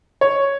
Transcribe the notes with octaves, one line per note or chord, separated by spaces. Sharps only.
C#5